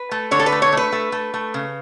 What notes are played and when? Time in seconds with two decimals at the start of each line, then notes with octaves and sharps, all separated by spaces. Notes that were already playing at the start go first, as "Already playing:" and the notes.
Already playing: B4
0.11 A3
0.31 D3 C#5
0.39 A4
0.46 B4
0.52 A3
0.62 C#5
0.72 A3 B4
0.92 A3
1.12 A3
1.34 A3
1.54 C#3